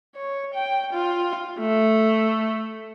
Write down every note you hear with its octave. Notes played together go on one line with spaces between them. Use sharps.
C#5
G5
F4
A3